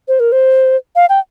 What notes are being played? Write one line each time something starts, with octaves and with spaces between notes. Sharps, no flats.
C5
A#4
C5
F5
G5